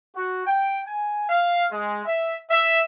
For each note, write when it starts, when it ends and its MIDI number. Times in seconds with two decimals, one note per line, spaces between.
0.16 0.42 66
0.46 0.80 79
0.87 1.29 80
1.29 1.65 77
1.71 2.02 56
2.06 2.37 76
2.49 2.82 76